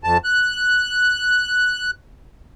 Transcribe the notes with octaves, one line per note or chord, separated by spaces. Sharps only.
F2 A5
F#6